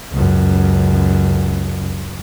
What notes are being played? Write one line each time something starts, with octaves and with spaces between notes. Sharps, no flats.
C#2 F#2